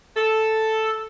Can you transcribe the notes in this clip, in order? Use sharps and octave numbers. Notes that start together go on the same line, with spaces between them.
A4